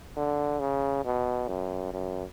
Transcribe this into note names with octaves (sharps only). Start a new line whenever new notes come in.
D3
C#3
B2
F#2
F#2